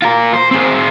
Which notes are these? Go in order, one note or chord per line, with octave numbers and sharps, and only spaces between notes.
F4 A#4
C5
C4 G#4